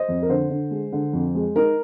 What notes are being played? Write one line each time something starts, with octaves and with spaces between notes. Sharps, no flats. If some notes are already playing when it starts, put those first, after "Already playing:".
Already playing: C5 D#5
F2
A#4
D3 C5
D3
G#3
D3
F2
G#3
D#4 A#4